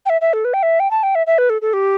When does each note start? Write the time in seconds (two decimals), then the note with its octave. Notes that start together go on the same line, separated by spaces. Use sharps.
0.06 G5
0.10 E5
0.21 E5
0.33 A4
0.45 B4
0.54 G5
0.63 E5
0.80 G5
0.91 A5
1.03 G5
1.15 E5
1.27 E5
1.38 B4
1.50 A4
1.62 A4
1.73 G4